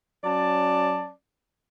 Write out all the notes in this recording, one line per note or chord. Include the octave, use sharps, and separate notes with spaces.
F#3 C#4 D5 A5